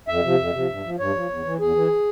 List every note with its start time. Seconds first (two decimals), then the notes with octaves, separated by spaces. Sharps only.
0.08 F2 E5
0.24 C3 F3
0.39 F2
0.54 C3 F3
0.69 G2
0.84 F3
0.99 G2 C#5
1.15 F3
1.30 E2
1.45 E3
1.60 E2 G#4
1.76 E3